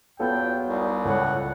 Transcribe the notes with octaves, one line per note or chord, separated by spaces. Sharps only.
E2 F#3 B3 F4 A4 G5
C2 D#4
C#2 A2 C#5 F#5